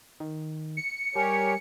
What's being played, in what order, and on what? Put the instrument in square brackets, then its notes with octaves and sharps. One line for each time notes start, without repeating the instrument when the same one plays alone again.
[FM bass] D#3
[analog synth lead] C#7
[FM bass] G3 [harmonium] G4 A#4 C#5 [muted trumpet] G#5